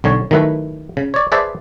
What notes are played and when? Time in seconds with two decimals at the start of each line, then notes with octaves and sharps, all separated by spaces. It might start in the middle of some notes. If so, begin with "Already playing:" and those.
0.04 B1 D3 C#5
0.31 D#3 F#3 A3 E4 B4
0.97 C#3
1.14 C#5 D5
1.32 G#4 B4 C5 D5 E5 A5